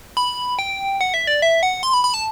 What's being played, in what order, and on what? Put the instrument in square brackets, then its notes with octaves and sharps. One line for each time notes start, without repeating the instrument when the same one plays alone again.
[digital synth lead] B5
G5
F#5
E5
D5
E5
F#5
C6
B5
B5
A5